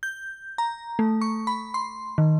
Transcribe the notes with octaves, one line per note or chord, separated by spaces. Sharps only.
G6
A#5
A3
C#6
B5
C6
D#3